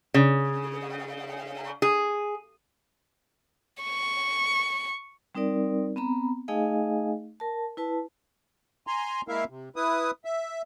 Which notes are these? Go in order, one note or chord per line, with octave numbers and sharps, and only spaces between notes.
C#3
G#4
C#6
G3 C4 D#4 A#4 D5
B3 C4 A#5 B5
A3 D#4 G#4 D#5 F5 G#5
A#4 A5
E4 B4 A5
G#5 A#5 C6
G#3 A#3 E4 A#4 E5 F5
C3
E4 B4 D#6
E5